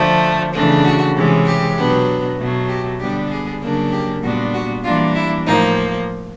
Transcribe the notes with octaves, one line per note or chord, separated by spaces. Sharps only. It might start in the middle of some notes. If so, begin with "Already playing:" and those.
Already playing: D3 F3 A3
C#3 E3 A3 D4
F#4
C3 E3 G#3 C#4
G4
B2 F#3 B3 D4
B2 F#3 A3
G4
D3 G3 B3 D4 G4
G#4
C#3 F#3 A#3 D4
G4
A#2 G3 B3 D4 F#4
F#4
E3 G3 A#3 D4 F4
E4
A2 F3 A#3 D#4